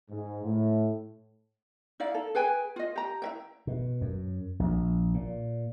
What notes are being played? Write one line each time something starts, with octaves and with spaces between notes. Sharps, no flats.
G#2
A2
D#4 E4 D5 F5
A4
G#4 B4 G5 G#5
F4 D#5
G4 A#5
E4 E5 G5
B2
F#2
A#1
A#2